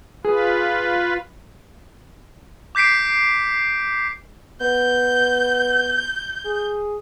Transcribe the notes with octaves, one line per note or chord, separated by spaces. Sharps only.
F4 G#4 B4
D6 G6 B6 C7 D7
B3 G6
G#4